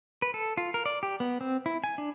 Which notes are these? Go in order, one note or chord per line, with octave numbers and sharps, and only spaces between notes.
B4
A4
F4
A#4
D5
G4
B3
C4
E4
G#5
D4